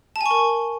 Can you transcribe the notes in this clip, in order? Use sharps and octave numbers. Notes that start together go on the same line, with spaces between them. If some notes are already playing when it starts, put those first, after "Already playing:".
A5
G#5
C#6
A#4